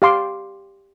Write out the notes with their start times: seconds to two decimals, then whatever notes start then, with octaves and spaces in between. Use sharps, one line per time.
0.02 G4 F5 C6 D6